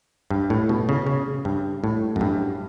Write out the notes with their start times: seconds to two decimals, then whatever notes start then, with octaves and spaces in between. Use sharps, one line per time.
0.30 G2
0.50 A2
0.69 B2
0.89 C#3
1.07 C#3
1.45 G2
1.84 A2
2.16 F#2
2.21 G2